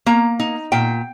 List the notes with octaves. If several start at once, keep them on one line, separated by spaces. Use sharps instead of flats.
A#3 A#5
D#4
A#2 G5